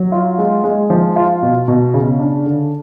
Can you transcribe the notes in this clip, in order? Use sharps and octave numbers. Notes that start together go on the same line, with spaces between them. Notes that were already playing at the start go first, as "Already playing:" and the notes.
Already playing: F#3
F4
G#3
G#3
F3
F4
B2
B2
C#3
D4
D3